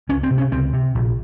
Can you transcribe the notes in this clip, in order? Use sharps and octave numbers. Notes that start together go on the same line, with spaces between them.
C#2 C#4
C4
C3
C#4
C#2 C4
C3
A#1